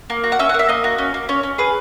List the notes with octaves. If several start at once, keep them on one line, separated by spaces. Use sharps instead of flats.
A#3
F#4
F#5
C#4 E5
F#5
A#3
E5
A#3 D#5
F#4
C#4
A#3
C#4 C#5
C#4
G#4 B4